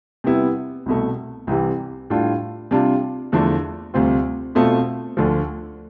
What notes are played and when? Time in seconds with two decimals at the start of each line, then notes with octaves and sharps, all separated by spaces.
0.24 C3 G3 B3 E4
0.86 C2 B2 A3
1.47 C2 C3 E3 G3
2.10 A2 G3 D4 F4
2.71 C3 G3 D4 F4
3.32 E2 D3 F3 A3 D4
3.94 D2 C3 G3 C4 F4
4.55 B2 A3 C4 F4
5.17 D2 D3 F3